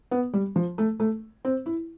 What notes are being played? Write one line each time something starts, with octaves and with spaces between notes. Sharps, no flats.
B3
G3
F3
A3
A3
C4
E4